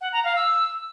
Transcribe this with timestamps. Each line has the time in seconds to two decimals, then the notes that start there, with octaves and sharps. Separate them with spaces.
0.01 F#5
0.13 A#5
0.24 F5
0.36 E6